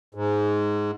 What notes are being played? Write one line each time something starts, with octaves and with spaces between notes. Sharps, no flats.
G#2